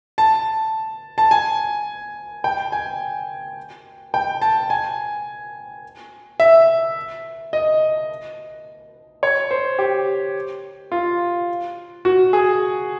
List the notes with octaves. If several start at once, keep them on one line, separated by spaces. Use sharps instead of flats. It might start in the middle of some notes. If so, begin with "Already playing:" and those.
A5
A5
G#5
G5
G#5
G5
A5
G#5
E5
D#5
C#5
C5
G4
F4
F#4
G#4